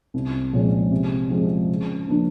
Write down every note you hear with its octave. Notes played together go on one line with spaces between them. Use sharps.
C2
A#2 F3 G#3 C#4
C3
F3 G#3 C4 F4
C#3
F3 A#3 D4